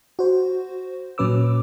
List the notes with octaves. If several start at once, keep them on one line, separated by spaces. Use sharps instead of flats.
F#4 C5
A#2 F#3 C#4 B4 D6 E6